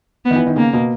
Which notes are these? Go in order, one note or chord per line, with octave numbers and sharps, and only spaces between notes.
B3
D#3
E3
D#3
C#3 A#3
B2